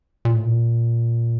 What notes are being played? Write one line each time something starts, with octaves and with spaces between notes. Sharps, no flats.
A#2
A2
A#2